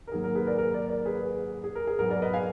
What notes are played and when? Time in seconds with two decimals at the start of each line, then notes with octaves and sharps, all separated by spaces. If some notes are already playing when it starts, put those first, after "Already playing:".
0.07 A#4
0.12 G#2 D#3 F#3 A#3 G#4
0.24 A#4
0.35 G#4 B4
0.47 A#4 D5
0.58 A#4
0.74 A#4 D5
0.89 A#4 D5
1.05 G#4 B4
1.64 G#4
1.75 A#4
1.87 G#4
1.98 G#2 F#3 B3 A#4
2.10 A#4 D5
2.22 B4 D#5
2.34 F5 G#5